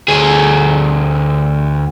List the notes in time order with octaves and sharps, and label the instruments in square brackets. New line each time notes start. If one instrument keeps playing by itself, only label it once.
[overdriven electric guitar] D2 G#4